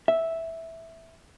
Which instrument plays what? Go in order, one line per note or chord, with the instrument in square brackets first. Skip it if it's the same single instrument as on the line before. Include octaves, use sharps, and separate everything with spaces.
[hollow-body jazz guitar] E5